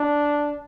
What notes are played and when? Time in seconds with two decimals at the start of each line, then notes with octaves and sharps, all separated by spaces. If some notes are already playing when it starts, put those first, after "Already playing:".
Already playing: D4